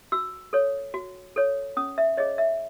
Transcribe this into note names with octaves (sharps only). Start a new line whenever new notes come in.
F#4 E6
A4 C#5
F#4
A4 C#5
C#4 D#6
E5
G#4 C#5 D#5
E5